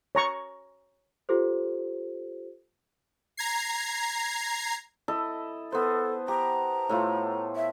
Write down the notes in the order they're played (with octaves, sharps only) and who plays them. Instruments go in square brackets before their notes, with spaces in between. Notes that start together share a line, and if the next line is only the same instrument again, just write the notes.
[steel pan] C#5 A#5 C#6
[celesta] F4 G4 A4 C5
[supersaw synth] A#5 G#6 C7
[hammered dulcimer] E4 A4 D#5
[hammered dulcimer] B3 C5 [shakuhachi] A4
[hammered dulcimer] G4 [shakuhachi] A#5
[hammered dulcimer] A2 A3 F4
[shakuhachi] E5